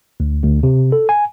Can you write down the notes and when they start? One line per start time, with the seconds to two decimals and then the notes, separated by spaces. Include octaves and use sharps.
0.20 D2
0.43 D2
0.63 C3
0.92 A4
1.09 G#5